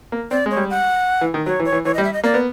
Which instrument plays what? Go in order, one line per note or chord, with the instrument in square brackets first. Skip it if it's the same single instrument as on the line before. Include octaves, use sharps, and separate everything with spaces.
[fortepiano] A#3
[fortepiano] C4 [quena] D5
[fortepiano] G#3 [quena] C#5
[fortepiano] G3
[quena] F#5
[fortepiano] E3
D#3
[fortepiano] F#3 [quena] C#5
[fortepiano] E3
[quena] C#5
[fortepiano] E3
[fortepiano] E3 [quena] C#5
[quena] D#5
[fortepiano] G3
[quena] E5
D#5
[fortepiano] A#3 [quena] D5
[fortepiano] B3